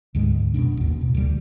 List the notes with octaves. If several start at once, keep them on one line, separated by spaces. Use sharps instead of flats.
D2 G#2 D3 G#3
D#1 F#2 B2 D4
A1 D#2
B2
D2 D3 E3 G3